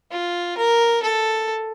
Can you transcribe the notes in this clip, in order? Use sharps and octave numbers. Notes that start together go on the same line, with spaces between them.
F4
A#4
A4